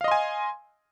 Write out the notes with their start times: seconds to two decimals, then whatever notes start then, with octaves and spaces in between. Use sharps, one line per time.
0.01 F5
0.04 D#5
0.08 C6
0.11 G#5